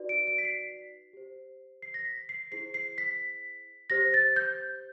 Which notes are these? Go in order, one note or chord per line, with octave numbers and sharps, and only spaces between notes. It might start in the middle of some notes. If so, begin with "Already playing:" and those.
Already playing: D#4 F#4 B4 D5
D7
D7
B6
C7
G4 C5
C7
A#6
B6
C7
E4 G#4 C5 C7
C7
B6
G4 C5 A#6
A6
G6